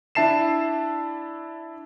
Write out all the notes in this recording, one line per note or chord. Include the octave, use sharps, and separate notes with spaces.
D4 E4 E5 A5 C7 E7